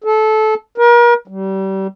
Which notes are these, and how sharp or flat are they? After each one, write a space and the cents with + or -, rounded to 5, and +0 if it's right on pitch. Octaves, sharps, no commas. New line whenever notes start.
A4 -20
A#4 +40
G3 -30